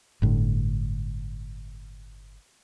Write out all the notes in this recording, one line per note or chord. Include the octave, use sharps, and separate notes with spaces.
G1 A2 D3